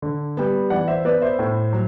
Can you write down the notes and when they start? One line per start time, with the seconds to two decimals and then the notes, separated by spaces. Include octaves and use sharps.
0.02 D3
0.37 G3 B3
0.70 E3 D5 F#5
0.88 C5 E5
1.04 B3 B4 D5
1.22 C5 E5
1.39 A2
1.73 F#3